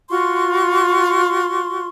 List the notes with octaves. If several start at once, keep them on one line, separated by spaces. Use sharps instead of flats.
F4 F#4 C6 C#6